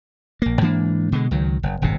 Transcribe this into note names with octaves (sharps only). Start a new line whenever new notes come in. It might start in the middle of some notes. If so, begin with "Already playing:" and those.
A#1 A#3
G#2 E3 A#3 D4
B2 D3 G#3
C#2 D#3 F#3
F#1
D#1 G#1 G2 C3